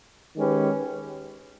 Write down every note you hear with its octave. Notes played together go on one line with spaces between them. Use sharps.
D#3 G#3 C#4 G4 B4